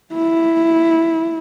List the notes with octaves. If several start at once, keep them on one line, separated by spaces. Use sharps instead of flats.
E4